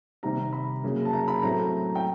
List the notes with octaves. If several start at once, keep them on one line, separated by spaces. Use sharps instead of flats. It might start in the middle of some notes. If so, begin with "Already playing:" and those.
C3 D#3 G3 A#5
B5
C#3 F#3 A#3
A5
A#5
B5
A2 F#3 A3 C4 A#5
G5